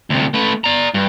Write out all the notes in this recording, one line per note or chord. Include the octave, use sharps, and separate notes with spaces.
D2 C3
A3 B4
D5 A#5
G2